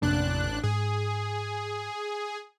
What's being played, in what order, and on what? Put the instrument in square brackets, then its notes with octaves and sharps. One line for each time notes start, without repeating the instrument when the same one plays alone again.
[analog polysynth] A1 D4 F#6 [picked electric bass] F2 C3 A#3
[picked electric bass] G#2 [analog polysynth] G#4